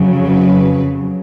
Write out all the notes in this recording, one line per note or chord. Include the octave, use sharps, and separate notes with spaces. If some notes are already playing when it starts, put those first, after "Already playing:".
Already playing: F2 C#3 F#3
B4